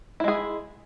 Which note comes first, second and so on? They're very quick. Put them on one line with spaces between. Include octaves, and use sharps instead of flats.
E4 G#3 G#4